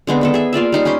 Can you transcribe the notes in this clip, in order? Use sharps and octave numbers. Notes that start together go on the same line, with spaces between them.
D3 G#3 B3 C4
D#3 B3 A4
G#4 E5
A#3 F4 D5 E5
G3 D#4 C5
C#4 G4 B4 C5